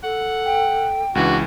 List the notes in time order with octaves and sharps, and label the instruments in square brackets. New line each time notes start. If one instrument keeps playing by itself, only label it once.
[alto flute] A4 [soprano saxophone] F#5
[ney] G5
[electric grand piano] C#2 E3 [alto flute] D4 [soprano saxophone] F#4